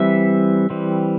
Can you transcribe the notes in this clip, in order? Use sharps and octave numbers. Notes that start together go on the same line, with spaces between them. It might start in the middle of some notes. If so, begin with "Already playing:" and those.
Already playing: E3 G3 C4 E5
E3 G3 C4